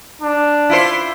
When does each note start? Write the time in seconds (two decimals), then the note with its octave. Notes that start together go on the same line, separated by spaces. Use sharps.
0.22 D4
0.70 E4 F4 C5